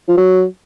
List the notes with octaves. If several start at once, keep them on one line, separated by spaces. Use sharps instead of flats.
F3
F#3